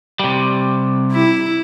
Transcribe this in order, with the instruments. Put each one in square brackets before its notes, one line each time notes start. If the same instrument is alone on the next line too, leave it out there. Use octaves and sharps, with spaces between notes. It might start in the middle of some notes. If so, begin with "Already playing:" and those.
[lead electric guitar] C3 G3
[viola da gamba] E4